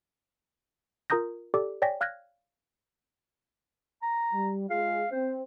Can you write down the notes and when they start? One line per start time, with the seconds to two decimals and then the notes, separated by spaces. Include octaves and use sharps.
1.10 F4 A#4 A#5 D#6 G6 A#6
1.54 G4 A4 D5 D6
1.82 C#5 D5 G5 G#5 A#6 B6
2.01 F5 F6 F#6 G#6 A#6
4.02 A#5
4.33 G3
4.70 G#3 F4 G#4 F5
5.12 C4 C5